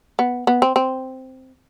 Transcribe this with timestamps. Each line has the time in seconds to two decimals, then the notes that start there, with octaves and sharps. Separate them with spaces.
0.19 B3
0.47 B3
0.62 C4
0.76 C4